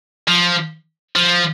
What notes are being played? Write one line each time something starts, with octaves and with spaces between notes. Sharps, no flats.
F3
F3